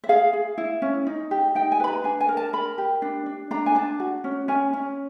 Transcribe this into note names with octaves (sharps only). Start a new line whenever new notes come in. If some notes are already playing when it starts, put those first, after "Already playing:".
E5
G#4 F5
G#4
E4
C#4
D#4
G4
D#4 G5
G#5
B4 B5
A#5
D4 G#5
G#5
A#4
A5
A#4 B5
G4
D4
D4
D4 A#5
G#5
D4 A5
F#4
C#4
C#4 G#5
C#4